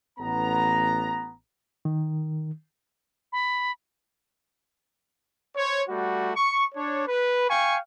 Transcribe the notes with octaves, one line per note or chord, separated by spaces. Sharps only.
A1 B3 A#5
D#3
B5
C5 C#5
G3 A3 F#4
C#6
D4 C#5
B4
F5 G5 G#5 C#6